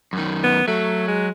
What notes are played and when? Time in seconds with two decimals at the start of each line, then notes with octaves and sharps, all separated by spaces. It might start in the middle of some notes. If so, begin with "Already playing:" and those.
0.13 F#2 D#3
0.44 B3
0.68 F#3 A3
1.08 G#3